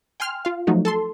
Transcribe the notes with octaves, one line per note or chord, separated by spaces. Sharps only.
G5 G#5 C6 F6
F4 F5
F3 F#3 A3 D#4 F#4
A4 A5 C6